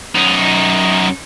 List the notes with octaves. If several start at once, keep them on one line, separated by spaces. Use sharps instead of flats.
F#2 D#4